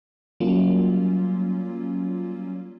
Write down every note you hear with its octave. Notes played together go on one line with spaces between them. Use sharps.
F#3 G3 A#3 C#4 F4